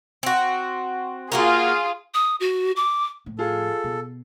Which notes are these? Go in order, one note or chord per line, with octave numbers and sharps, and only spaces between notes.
C4 F#4
A#3 F4 F#4 G#4 A#4
D#6
F#4
D6
A2 F3
F4 G#4 A4
B2